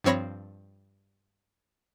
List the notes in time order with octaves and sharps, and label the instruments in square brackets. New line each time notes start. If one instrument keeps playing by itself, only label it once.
[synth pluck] G2 F3 C4 C#5 B5 A#6